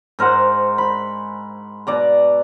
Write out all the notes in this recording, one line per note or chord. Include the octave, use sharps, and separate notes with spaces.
G#2 A#4 C5 F#5
B5
B2 D5 A#5